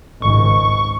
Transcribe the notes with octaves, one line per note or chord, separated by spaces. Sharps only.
G#1 C#2 G#2 C#6